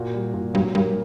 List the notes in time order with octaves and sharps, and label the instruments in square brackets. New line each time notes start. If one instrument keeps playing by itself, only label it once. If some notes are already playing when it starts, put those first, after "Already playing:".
Already playing: [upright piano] A#2 F#4
G3
A#2
[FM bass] G2 [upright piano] F#3
[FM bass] G2 [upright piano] A#3